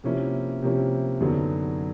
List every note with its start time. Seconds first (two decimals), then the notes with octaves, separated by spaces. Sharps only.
0.04 C3 F3 A#3 C#4 E4
0.62 C3 F3 A#3 C#4 E4
1.20 F#2 D3 F#3 B3 D#4